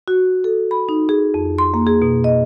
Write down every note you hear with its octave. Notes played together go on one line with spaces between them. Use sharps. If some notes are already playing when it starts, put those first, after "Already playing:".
F#4
A4
B5
D#4
G#4
F2
C6
A#3
G#4
B2
D#5